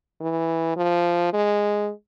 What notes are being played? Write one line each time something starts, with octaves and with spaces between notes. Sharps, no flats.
E3
F3
G#3